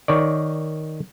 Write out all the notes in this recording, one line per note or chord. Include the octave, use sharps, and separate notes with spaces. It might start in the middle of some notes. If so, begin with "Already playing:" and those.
D#3 C#5 D5